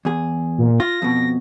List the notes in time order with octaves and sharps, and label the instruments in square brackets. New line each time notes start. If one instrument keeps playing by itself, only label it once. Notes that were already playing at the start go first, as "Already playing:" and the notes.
[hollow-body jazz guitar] E2 G#4
[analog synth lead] A#2
[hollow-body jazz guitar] F4 [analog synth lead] A#6
[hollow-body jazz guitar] F2 B2